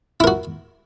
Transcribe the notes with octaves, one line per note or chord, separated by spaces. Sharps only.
E4 F#4 A#4